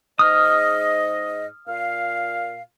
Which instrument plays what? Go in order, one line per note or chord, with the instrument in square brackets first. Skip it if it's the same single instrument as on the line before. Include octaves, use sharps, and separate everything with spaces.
[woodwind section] G#2 D#5 [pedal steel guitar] D#6 F6
[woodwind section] A#2 F5